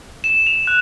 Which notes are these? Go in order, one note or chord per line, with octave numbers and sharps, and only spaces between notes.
E7
F7
F#6